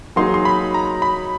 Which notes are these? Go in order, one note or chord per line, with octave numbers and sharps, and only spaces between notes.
F#3 A#3 D#4 G#4 C6
C6
B5
A#5
B5